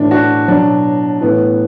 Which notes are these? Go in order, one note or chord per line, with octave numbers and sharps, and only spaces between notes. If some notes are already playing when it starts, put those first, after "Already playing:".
Already playing: A2 E3 D4
D4 F#4
B2 F#3 D4
A2 E3 B3